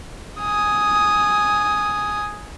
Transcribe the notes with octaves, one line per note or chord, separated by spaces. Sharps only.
G#5 D#6